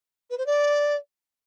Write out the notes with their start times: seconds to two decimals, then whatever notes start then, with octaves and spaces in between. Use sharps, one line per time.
0.30 B4
0.38 C5
0.46 D5